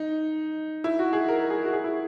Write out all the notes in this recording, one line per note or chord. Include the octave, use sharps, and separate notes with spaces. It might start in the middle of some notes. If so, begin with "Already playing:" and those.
Already playing: D#4
E4
F#4
G#4
A#4
G#4
F#4
G#4
E4